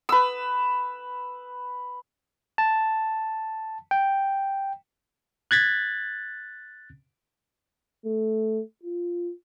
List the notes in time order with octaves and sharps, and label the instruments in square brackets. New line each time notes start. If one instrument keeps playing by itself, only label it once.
[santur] B4 E6
[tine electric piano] A5
G5
F#6 G#6 A6 B6
[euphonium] A3
F4